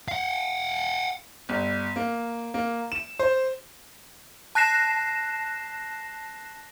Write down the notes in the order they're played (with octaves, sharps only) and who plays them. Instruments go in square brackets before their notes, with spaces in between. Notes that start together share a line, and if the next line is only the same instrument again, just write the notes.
[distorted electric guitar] F5 F#5
[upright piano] G1
A#3
A#3
E7
C5
[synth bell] A5 F#6 A#6 C7 E7